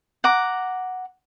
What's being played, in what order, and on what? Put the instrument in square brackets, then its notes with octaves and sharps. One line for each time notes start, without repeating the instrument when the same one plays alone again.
[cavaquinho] F#5 A#5 D6